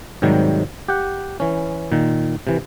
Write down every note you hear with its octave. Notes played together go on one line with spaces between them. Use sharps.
G#2 C3 D#3 F#3 G3
G4 F#5
E3 C#4
A#2 D#3
C3 E3